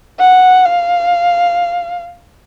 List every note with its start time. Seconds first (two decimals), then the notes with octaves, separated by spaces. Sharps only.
0.19 F#5
0.65 F5